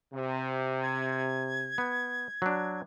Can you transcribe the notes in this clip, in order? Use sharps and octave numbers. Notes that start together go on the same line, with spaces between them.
C3
G#6
B3
F#3 D4